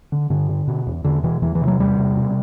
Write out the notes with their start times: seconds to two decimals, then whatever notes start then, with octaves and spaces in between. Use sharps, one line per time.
0.12 D3
0.30 G2 D3
0.49 D3
0.68 B2
0.87 E2
1.05 E2 D3
1.24 B2 E3
1.42 E2 E3
1.55 E3
1.61 C3
1.67 F#3
1.79 E2 G3
1.98 C3
2.17 B2